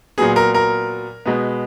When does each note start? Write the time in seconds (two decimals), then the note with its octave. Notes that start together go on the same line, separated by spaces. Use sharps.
0.18 A#2 F#3 B3 G#4
0.36 A#4
0.54 A#4
1.26 B2 G#3 B3